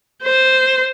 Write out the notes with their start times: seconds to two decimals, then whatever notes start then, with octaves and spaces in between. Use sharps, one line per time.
0.23 C5